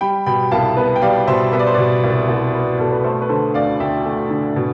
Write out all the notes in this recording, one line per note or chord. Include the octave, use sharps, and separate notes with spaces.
G3 G5 B5
B2 G5 B5
C2 F5 A5
B3 B4
G5
G3 D5 F5
B2 C5 E5
B3 E5
D5
C5
B2 B4 D5
C2
C2
B3
B2 A4
B4
A3 A4 C5
B4
D3 A4 C5
D2 D5 F5
D2 E5 G5
A3
D3
B2